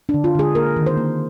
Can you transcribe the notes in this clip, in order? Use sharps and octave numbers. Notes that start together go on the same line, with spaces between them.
D4
D3
F4
D3 G#4
A#3 A#4
D#3
C5
A#3